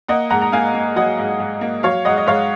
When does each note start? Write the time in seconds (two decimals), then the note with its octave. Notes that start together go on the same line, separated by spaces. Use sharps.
0.08 A#3 D#5 F#5
0.30 G#2 F#5 A#5
0.42 A#5
0.52 A#3 F5 G#5
0.74 A#3
0.96 F#3 D#5 F#5
1.19 G#2
1.40 G#2
1.61 A#3
1.83 F#3 C#5 F5
2.05 G#2 D#5 F#5
2.17 D#5
2.27 G#2 C#5 F5